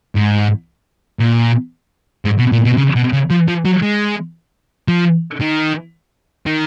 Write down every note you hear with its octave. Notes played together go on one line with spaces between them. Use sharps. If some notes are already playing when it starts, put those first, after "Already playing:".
G#2
A#2
G#2
B2
A#2
B2
C#3
B2
C#3
F3
F3
F#3
G#3
F3
D#3
D#3